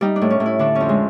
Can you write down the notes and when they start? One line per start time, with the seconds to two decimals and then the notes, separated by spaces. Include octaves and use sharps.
0.01 G3 D#4
0.16 D4
0.21 A2
0.30 C#4
0.40 A2
0.46 E4
0.59 D3 D4
0.75 F2 C#4
0.89 G#3